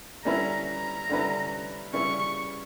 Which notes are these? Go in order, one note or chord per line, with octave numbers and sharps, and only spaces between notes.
D3 G3 C#4 E4 B4 A#5
A#5
D3 G3 C#4 E4 B4
C#3 G3 C#4 E4 B4 C#6